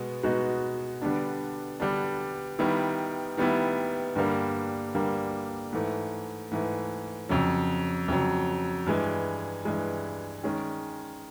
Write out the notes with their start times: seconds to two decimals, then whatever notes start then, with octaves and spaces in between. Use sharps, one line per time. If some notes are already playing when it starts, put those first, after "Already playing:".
Already playing: B2 G#3 B3
0.23 B2 G#3 B3 D#4 F#4
1.02 D3 G3 B3 D4
1.80 D3 G3 B3 D4
2.59 D#3 G3 B3 E4
3.37 D#3 G3 B3 E4
4.15 G2 D3 G3 A#3
4.94 G2 D3 G3 A#3
5.73 G#2 E3 A3
6.51 G#2 E3 A3
7.29 F2 C#3 F#3
8.08 F2 C#3 F#3
8.86 G2 E3 G#3
9.65 G2 E3 G#3
10.44 D#3 G#3 C#4